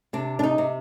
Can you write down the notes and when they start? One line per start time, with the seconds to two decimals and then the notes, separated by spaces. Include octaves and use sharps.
0.13 C3 D4
0.39 D4
0.43 D#4
0.58 C3